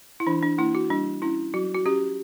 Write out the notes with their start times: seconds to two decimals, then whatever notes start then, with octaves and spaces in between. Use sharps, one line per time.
0.20 E4
0.27 E3 D4
0.43 D4
0.58 A#3 D4 E4
0.75 F#4
0.90 G3 D4
1.22 C#4 E4
1.54 F#3 F#4
1.74 F#4
1.86 C#4 G4